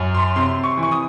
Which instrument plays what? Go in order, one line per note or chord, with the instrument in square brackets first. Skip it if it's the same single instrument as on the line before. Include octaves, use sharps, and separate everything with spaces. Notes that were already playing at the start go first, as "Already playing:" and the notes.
Already playing: [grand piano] F#2
C6
C3 C6
C#6
E3
C#6
D#6